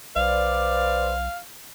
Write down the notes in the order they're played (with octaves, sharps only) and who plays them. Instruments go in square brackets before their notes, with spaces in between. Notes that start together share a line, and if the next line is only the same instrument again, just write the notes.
[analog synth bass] B1 [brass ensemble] B4 C5 D5 [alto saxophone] F5